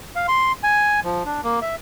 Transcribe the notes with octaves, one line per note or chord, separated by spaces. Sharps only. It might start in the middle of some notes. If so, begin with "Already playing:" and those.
F5
C6
G#5
F3
D4
A#3
E5